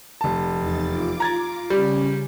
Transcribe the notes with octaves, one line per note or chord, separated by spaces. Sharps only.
F1 A5
E2 D#4 A6
F4 D6
A#5 G#6 A6
C#3 G3 C#4